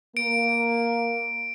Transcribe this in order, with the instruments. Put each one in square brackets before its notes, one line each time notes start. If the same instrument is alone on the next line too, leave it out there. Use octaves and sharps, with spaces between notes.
[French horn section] A#3 [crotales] D7